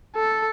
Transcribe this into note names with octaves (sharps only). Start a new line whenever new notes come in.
A4